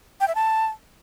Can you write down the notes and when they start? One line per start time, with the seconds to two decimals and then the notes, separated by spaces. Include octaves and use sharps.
0.21 G5
0.28 E5
0.35 A5